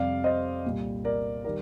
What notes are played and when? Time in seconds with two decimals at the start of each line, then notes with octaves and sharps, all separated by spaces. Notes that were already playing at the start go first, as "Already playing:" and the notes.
Already playing: F2 C3 G3 D5 F5
0.24 C5 D#5
0.64 C2 A#2 G3
1.04 A#4 D5
1.44 D#3 G3 A#4 D5